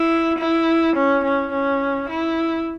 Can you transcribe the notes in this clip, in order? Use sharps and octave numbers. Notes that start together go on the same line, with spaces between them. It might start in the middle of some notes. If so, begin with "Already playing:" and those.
Already playing: E4
E4
C#4
C#4
C#4
E4